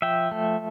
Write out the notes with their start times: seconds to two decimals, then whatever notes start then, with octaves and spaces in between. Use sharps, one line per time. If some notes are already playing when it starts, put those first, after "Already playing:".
0.02 F3 E5 G5
0.31 A3